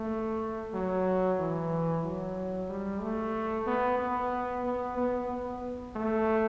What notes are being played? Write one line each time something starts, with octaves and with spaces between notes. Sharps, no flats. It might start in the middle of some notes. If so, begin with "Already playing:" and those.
Already playing: A3
F#3
E3
F#3
G3
A3
B3
B3
B3
B3
B3
A3